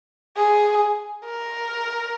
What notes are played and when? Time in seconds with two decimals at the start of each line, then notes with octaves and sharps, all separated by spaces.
0.37 G#4
1.25 A#4